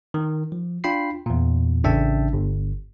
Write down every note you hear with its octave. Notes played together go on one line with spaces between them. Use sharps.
D#3
F3
D4 F4 G5 B5 C7
E2 A#2
A1 C#3 D4 E5 G5 A5
G1